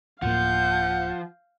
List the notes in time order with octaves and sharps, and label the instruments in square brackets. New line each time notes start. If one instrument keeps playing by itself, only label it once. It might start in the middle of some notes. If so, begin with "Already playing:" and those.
[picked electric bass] D1 A2 A#3 [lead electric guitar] F3 [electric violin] F5 G6 [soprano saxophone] F#5